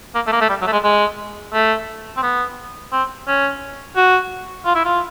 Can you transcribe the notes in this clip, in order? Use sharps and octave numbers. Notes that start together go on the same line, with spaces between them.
A#3
A3
A#3
A3
G3
F#3
A3
G#3
G#3
A3
C4
B3
C4
C#4
F#4
F4
E4
F4